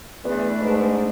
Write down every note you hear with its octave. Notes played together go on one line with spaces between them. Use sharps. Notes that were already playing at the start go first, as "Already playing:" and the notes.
E2 A3 D4 B4
G#2